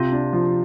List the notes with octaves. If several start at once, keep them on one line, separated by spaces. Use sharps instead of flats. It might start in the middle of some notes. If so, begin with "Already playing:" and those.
Already playing: C3 F4
D4
F3